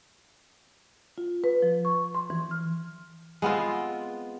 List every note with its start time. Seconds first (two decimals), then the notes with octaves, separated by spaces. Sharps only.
1.18 F4
1.44 B4
1.62 F3
1.85 C#6
2.15 C6
2.30 E3
2.51 F6
3.42 G#3 B3 C4 F4